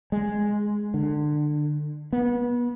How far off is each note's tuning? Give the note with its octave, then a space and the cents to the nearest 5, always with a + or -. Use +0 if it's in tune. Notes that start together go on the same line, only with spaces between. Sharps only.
G#3 +0
D3 +25
B3 -30